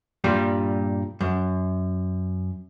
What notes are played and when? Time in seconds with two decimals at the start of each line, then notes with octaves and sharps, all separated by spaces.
0.24 G2 A#2 G3
1.21 F#2